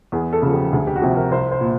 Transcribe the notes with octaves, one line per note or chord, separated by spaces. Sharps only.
E2 G#4
A4
C#3 F3
G4
D2 G#4
G4
F#4
C3 F3 G4
A#4
C2 C5
C5
A#2